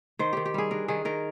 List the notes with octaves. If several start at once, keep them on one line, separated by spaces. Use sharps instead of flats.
D#3 C5
D#3 G4
G4
G3 G#4
D4 A#4
D#3 G#4
D#3 A#4